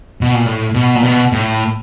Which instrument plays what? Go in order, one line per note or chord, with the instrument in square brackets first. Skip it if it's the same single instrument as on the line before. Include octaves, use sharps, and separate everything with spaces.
[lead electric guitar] B2
A#2
A2
B2
A#2
B2
A2